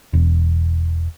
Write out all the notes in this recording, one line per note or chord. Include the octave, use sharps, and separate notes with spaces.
E1